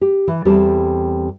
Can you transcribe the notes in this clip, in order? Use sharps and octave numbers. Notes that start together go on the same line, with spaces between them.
G4
E3
E2 G3 C4 G4 A4 A5